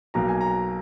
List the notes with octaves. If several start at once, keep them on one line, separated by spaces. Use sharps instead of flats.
B1 B2 A#3 A#5
G#5
A#5